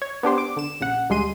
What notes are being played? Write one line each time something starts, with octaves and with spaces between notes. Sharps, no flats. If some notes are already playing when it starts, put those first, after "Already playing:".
C#5
B3 D4 G4 C5
D6
D3 E7
A#1 C#3 F#5
D2 G3 G#3 C6 D#7